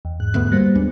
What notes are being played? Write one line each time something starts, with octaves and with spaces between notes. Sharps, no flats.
E2
G#2 F#6
D2 A3 B3
G3 A#3 C5
D#2 G#3 B3 D4